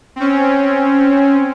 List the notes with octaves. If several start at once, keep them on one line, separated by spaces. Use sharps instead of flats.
C4 C#4